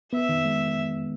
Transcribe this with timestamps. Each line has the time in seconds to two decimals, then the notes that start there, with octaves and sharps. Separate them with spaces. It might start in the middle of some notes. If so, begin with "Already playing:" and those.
0.13 B3 E5
0.29 D#3
0.45 G#3